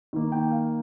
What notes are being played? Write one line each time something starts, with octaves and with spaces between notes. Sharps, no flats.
D#3 A#3
G5
F5